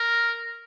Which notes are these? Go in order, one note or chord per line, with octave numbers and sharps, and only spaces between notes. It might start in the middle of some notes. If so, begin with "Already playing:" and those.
Already playing: A#4